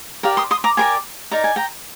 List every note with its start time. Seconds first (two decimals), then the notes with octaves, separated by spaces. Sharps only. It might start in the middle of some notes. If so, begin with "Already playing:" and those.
0.23 G4 A#4 D5 F5
0.37 C6 D#6
0.51 C6 D#6
0.64 A#5 D6
0.77 G4 A#4 D5 G#5 C6
1.31 D#4 A#4 D5 A#5
1.44 G#5
1.56 G5 A#5